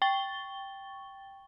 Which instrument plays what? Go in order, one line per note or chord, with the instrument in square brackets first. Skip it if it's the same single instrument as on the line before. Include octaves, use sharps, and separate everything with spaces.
[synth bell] G5 C#6 A6 G7